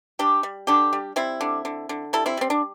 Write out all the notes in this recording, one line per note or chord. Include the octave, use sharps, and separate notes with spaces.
G3 D4 G4
G3
D3 D4 G4
G3
G3 C4 E4
D3
D3
D3
G3 E4 A4
C4 E4
G3 C4
D4